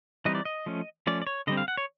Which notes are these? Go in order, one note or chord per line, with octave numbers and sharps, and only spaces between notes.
E3 G3 C4 D#4 D#5
D5
D#5
F3 A3 C#4
F3 A3 C#4 D5
D5
C#5
D3 G3 C4 D#5
F5
F#5
C#5